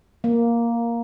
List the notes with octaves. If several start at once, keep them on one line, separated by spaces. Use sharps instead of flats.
A#3